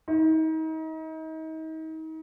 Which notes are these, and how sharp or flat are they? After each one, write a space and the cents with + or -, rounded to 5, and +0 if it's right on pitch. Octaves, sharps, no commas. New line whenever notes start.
D#4 +35